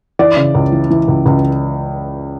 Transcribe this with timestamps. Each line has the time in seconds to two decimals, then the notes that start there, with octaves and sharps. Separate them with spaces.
0.19 E3 D5
0.37 C#3
0.55 C#2
0.72 E3
0.90 E3
1.08 C#2
1.26 C#2